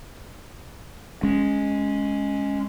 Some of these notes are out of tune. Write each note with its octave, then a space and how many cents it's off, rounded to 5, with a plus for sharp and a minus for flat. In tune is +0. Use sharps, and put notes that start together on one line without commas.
G#3 +0 C#4 +0